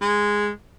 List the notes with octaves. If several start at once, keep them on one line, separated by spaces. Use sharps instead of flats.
G#3